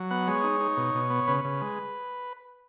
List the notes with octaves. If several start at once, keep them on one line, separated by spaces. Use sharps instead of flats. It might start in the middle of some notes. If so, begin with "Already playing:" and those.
Already playing: F#3
B3 F#5
G#3 C#5
D#4
D#4
B2
B2
B3
C#3 B4
C#3
G#3